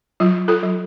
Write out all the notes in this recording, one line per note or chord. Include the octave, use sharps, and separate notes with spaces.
F#3 F4
F4 A4
F#3